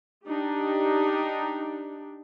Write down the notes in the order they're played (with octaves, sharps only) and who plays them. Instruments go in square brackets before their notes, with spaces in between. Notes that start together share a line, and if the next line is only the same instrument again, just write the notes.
[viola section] D4 D#4 G4